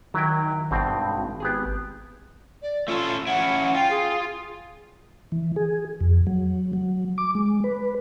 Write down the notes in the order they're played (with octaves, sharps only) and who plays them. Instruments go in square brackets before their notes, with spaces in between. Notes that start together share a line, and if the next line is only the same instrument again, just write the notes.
[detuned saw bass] D#3 [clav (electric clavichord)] F#3 E4 G5
[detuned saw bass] G#1 [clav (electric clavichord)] G2 B2 C4
[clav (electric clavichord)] B3 G4 G#4
[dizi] D5
[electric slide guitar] A3 C#4 A4 [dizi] F4
[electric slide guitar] C#4 E4 [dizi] F#5
[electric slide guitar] F4 [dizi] G5
[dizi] G#4
[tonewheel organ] E3
G#4
F2
F#3
F#3
D6
G#3
B4